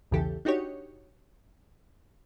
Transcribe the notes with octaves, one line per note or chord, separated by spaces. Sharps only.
B1 E2 C#3 E3 G4 A4
D4 D#4 F#4 G4 C#5